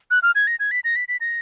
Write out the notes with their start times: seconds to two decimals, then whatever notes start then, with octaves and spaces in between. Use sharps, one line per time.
0.11 F#6
0.23 F6
0.35 G#6
0.47 A#6
0.60 G#6
0.71 B6
0.84 A#6
0.96 B6
1.08 B6
1.21 A#6